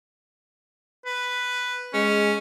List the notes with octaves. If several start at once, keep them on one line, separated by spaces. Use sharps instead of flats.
B4
G#3 C#4